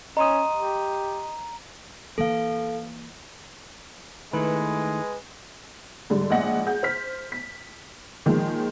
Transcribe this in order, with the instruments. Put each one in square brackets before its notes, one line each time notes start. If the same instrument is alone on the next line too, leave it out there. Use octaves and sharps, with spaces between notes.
[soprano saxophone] C#4 [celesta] D#5 C6 D#6 [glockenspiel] A#5 D#7
[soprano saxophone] G4
[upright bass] E3 A#3 [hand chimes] A4 F5
[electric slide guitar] D#3 A3 E4 [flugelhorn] G#3 [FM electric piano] B4
[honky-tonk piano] G#2 D3 G3
A#1 G#2 D#5 F#5 A#6
G#4 F#5 G6
C5 F6 B6
B6
A#2 D#3 F3 G#3